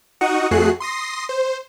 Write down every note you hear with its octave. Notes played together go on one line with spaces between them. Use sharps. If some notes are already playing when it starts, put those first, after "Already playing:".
D#4 F#4 F#5 C#6 D#6
F2 A3 F#4 G#4 F#6 C7
C6 D#6 A#6 C7
C5